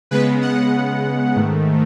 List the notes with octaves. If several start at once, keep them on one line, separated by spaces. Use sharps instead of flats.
C#3 G#3 B3 B4
F#5
G#2 D#3 A3